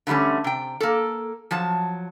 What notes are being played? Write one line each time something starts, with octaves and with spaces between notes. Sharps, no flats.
D3 E3 G3 A3 C#4
C3 G5
A#3 A4
F3 F#3 A5